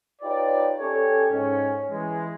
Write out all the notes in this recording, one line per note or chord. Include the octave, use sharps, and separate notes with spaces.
D#4 F4 G4 B4 C#5 D5
C#4 G4 A4 C#5
G#2 C#4
E3 G#3